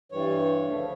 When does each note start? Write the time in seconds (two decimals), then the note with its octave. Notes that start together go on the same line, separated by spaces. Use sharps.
0.12 G2 E3 G3 C#5
0.65 D2 C#3 F3 A3